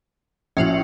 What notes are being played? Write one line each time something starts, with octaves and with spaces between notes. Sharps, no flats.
A#1 A2 C#4 F4 F#4